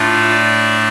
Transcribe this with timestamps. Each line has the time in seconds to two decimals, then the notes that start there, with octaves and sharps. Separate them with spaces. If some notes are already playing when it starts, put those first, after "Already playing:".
Already playing: A2 A3 D4 F4
0.31 D5